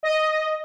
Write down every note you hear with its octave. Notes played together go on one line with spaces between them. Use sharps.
D#5